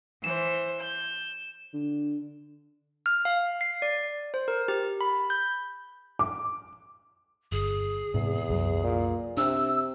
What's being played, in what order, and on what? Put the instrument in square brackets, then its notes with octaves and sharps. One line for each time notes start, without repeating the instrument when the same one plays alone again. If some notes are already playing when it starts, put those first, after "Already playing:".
[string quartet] E3 C5 [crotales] E7
[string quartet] G6
[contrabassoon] D3
[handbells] F6
F5
C7
D5
C5
A#4
G4
B5
G6
[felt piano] D6
[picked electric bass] G1 [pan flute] G#4
[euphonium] E2 [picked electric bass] G#2 C3
[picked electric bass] C2 F#2 F#3
[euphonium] A#2
[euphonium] C3 [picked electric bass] D4 [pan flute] E6